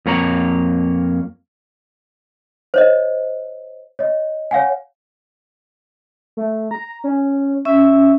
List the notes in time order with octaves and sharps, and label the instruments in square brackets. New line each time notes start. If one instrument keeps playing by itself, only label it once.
[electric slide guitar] F2 A#3 C#5 A#5
[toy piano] C5 C#5 D#5
[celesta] C#5 D#5
C#5 F5 F#5 G#5
[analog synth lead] A3
A#5
C#4
[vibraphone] C#4 [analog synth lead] E5